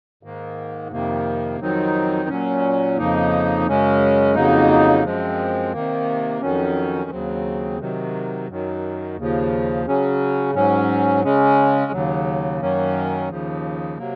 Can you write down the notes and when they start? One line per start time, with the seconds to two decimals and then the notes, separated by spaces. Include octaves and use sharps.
0.23 G#2 D#3 A#3
0.91 F2 C3 D#3 A#3
1.60 F2 D#3 F#3 C4 D#4
2.29 A#2 F#3 C#4
2.97 F2 C#3 F3 A#3 D#4
3.67 F#2 C#3 G#3 C#4
4.35 F2 C#3 F#3 A#3 D#4
5.04 F#2 F3 G#3 C4
5.72 C3 D#3 A#3
6.42 F2 D#3 F#3 C#4
7.10 D#2 C#3 F#3 C4
7.79 C3 D#3 F#3
8.48 F#2 D#3 F#3
9.17 D#2 C#3 F3
9.86 C#3 F#3 C#4
10.54 G#2 F#3 C#4
11.23 C#3 G#3 C#4
11.92 D#2 C#3 F#3
12.61 F#2 D#3 F#3 A#3 C#4
13.29 D#2 C#3 F3
13.98 C3 F#3 A#3